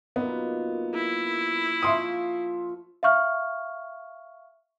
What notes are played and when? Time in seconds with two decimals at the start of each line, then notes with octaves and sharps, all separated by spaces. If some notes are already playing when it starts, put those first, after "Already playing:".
0.16 F#2 A#2 B3 D#4
0.94 E4
1.83 F3 F4 E5 C6 C#6 D#6
3.03 E5 F5 C#6 F6